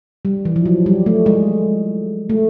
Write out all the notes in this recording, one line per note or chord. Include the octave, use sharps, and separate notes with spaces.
G3
E3
F3
F#3
G3
A3
G#3
A3